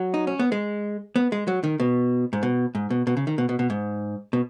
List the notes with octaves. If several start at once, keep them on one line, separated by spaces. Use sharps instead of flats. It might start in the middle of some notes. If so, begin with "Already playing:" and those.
Already playing: F#3
D#4
C#4
B3
G#3
B3
G#3
F#3
D#3
B2
G#2
B2
G#2
B2
B2
C#3
D#3
B2
B2
B2
G#2
B2